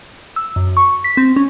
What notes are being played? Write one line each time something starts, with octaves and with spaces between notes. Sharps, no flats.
E6
F#2
C#6
B6
C4
C#4